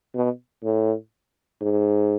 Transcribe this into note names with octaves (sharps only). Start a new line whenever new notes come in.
B2
A2
G#2